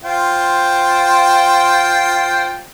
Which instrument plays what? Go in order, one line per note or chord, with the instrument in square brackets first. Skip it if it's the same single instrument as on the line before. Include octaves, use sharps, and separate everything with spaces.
[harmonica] F4 C5 G5